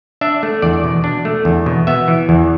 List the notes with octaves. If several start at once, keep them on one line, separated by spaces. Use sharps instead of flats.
D4 E5
A3
E2 D5
B2
D4
A3
E2
B2
B3 E5
E3
E2